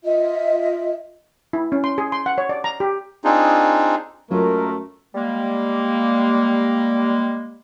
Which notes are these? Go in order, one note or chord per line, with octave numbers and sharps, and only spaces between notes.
F4 D#5 E5
E4
C#4
C6
G#4
C6
F#5
C#5
D5
A#5
G4
C4 D4 D#4 F4 G#4
F#2 F#3 G#3 A3 F4 A#4
G3 G#3 A#3